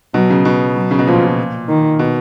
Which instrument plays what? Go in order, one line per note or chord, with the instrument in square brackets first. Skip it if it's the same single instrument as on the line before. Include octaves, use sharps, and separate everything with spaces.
[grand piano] B2 [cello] F#3
[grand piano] C#3
B2
[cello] F#3
[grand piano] C#3
B2
[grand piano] A#2 [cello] F3
[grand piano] A#2
[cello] D#3
[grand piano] B2